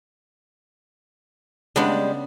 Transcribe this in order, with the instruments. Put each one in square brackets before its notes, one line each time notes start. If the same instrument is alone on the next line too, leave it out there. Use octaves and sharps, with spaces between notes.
[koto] C#3 B3 D4 [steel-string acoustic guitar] G3 G#3